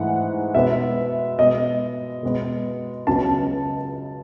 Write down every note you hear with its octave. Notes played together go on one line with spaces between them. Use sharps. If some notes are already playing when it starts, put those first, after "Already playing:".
Already playing: G#2 E3 A3 F#5
B2 G#3 B3 E5
B2 G#3 B3 D#5
B2 G#3 B3
C#2 C#3 F#3 B3 A5